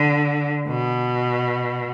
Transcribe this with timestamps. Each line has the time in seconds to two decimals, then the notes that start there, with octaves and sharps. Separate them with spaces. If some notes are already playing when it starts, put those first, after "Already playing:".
Already playing: D3
0.67 B2